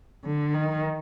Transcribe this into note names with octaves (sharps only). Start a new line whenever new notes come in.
D3
D#3